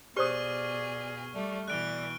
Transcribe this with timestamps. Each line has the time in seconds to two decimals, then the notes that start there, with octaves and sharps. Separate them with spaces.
0.17 B2 G4 G#4 C5 D5 C#6 D#6 F6
1.34 G3 A3 D5
1.68 B2 E3 D5 F#6 D7 G7